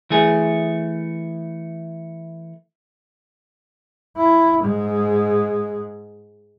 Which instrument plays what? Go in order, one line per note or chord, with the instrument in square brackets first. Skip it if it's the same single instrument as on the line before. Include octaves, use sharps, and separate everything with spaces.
[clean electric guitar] E3 A3 G#4
[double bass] E4
G#2 G#3